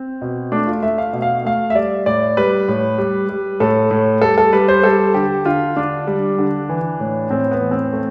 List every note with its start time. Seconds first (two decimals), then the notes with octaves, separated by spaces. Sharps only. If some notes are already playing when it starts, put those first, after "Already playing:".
Already playing: C4
0.21 B2
0.52 A3 D4
0.67 F4
0.82 A3 E5
0.98 F5
1.13 B2
1.22 F5
1.45 A3 F5
1.70 E5
1.75 G3 D5
2.06 A2 D5
2.37 G3 B4
2.68 A2
2.98 G3
3.29 G3
3.60 A2 A4
3.91 A2
4.21 G3 A4
4.38 A4
4.53 G3 B4
4.68 C5
4.83 G3 A4
5.14 D3 G4
5.45 D3 F4
5.76 D3 D4
6.07 G3
6.38 D3
6.69 E3
7.00 A2
7.30 A2 C4
7.51 B3
7.61 E3
7.71 C4
7.93 A3